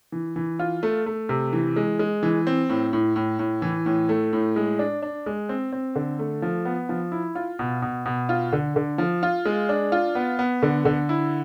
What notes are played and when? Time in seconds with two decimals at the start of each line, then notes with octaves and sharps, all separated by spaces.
0.12 E3
0.36 E3
0.59 F4
0.83 A3
1.06 A3
1.29 C3
1.53 E3
1.76 G#3
1.99 G#3
2.23 E3
2.47 C4
2.69 A2
2.93 A2
3.16 A2
3.39 A2
3.62 E3
3.86 A2
4.09 A3
4.33 A2
4.56 G#3
4.79 D4
5.02 D4
5.26 G#3
5.49 C4
5.73 C4
5.95 D3
6.19 A3
6.42 F3
6.65 B3
6.89 F3
7.12 E4
7.35 F4
7.59 B2
7.82 B2
8.06 B2
8.29 F4
8.53 D3
8.76 D3
8.98 F3
9.23 F4
9.46 G#3
9.69 D4
9.92 F4
10.15 B3
10.39 B3
10.62 D3
10.85 D3
11.09 E4